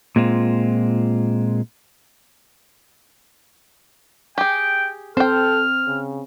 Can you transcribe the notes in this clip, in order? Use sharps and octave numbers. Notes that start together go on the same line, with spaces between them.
A#2 G#3 C4 F4
G4 G#4 G5
C4 A4 C5 G5 F6
C#3